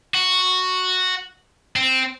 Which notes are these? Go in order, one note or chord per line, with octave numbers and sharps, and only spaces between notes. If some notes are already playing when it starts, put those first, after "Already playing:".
F#4
C4